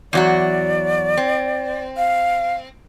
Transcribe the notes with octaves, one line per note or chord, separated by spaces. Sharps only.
E2 F#3 F#4 D5
C4
F5